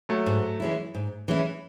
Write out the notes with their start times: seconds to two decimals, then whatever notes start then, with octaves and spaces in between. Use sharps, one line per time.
0.09 F#3 A3
0.26 G#2
0.60 E3 G#3 C#4 E4
0.95 G#2
1.28 E3 G#3 C#4 E4